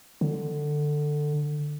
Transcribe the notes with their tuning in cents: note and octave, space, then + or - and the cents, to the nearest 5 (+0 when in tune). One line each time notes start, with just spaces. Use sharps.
D3 +15